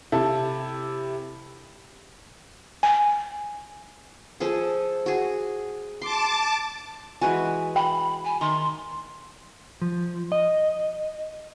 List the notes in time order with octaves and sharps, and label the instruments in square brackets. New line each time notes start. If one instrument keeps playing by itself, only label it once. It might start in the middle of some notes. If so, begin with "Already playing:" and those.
[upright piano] C3 E4 A4
[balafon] G#5
[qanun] F3 G#4 A4
F#4 G#4
[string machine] A5 D6 [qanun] C6
[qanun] E3 G#3 F#4 [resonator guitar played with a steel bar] B4 G#5
[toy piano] G5 [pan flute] B5
[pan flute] G#5
[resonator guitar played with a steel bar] D#3 [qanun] A#5 [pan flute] C6
[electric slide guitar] F3
D#5